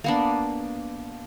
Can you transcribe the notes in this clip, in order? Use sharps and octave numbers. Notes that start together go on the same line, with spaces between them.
A#3 B3 D4